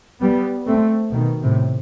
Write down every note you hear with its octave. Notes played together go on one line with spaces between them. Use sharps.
G3 B3
A3 C4
B2 D#3
A2 C3